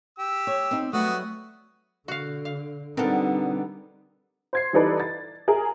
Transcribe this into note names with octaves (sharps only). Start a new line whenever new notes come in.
G4 E6
C#5
C4 D#4
F#3 G3 A3 B3 F#4 D#6
D3 F#4 F5
F5
D3 G3 B3 C4 D#4 A4 A#4
C5 G#6 C7
E3 G3 D#4 A4 B4 D5
A6
G#4 A#4 G#5